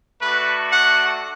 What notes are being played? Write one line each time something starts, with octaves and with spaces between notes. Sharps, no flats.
A3 D4 F#4 B4
F#5